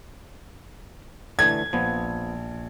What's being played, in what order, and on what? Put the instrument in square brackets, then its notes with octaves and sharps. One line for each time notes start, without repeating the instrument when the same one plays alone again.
[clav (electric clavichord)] D3 E3 A3 [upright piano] G#6
[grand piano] A#1 [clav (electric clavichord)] F3 B3